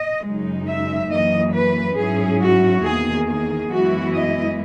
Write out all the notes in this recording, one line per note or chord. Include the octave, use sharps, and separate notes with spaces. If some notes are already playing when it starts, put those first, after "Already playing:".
Already playing: D#5
F#2 C#3 G#3 D#4
E5
F#2 E3 A#3 D#5
B4
G#2 F#3 C#4 E4 G#4
F#4
E2 D#3 A#3 G#4
G#4
F#2 E3 G#3 B3 E4 F#4
D#5